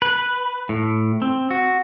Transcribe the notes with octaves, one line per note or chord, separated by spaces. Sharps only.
B4
A2
C4
F#4